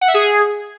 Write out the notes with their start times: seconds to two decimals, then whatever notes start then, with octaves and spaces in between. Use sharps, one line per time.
0.01 F#5
0.08 E5
0.14 G#4